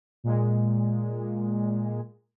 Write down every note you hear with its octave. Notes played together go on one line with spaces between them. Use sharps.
A#2 G#3